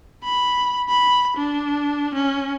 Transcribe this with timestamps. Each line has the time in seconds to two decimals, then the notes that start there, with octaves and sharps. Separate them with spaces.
0.24 B5
0.89 B5
1.37 D4
2.14 C#4